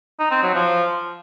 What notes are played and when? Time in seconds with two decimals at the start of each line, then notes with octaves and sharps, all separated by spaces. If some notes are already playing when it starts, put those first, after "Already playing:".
0.19 D#4
0.31 C4
0.43 F#3
0.54 F3